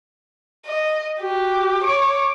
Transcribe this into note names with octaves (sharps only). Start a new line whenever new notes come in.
D#5
F#4 G4
C#5 D6